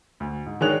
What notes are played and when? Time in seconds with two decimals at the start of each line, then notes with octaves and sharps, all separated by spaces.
0.20 D2
0.46 G#2
0.61 D#3 G#3 D4 C#5 F#6 F7